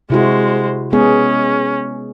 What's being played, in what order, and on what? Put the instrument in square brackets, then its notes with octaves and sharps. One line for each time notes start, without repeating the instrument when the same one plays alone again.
[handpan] C3 E4 F#4 [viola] G#3 C5
[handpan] G#3 B3 G#4 [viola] C#4